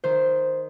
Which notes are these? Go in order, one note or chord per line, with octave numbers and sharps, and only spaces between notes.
D#3 C5